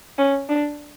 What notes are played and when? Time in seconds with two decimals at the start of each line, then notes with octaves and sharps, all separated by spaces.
0.18 C#4
0.49 D4